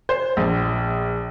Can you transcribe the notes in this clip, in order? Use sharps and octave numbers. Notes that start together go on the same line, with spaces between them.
C5
A#1